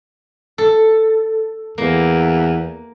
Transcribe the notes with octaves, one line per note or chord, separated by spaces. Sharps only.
A4
E2 A#3